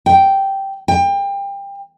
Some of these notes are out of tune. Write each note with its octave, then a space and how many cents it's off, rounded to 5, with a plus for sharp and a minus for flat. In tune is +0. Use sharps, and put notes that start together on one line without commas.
G5 -5
G5 +25